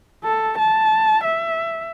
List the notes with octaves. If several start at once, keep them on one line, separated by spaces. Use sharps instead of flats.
A4
A5
E5